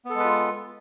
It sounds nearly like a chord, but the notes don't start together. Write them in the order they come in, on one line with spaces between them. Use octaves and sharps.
B3 A4 G#3 B4 F4